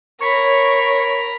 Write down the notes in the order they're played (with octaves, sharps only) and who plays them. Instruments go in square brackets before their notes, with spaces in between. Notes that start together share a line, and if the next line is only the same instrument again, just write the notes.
[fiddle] A#4 B5 [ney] C#5 [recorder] C#6